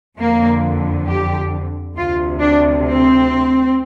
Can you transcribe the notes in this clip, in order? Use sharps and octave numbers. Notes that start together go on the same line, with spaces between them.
F2 D3 A#3
G4
D2 C3 F4
D4
C4